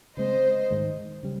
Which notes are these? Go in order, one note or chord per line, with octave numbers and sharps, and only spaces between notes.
C#3 G#3 C4 C5 D#5
G#2 D#3 G#3
C#3 G3